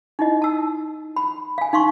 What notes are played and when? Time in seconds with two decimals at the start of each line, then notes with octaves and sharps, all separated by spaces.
0.19 D#4 E4 D#5
0.42 A5 E6
1.16 B5
1.58 F5 G#5
1.73 D#4 F5 C6 C#6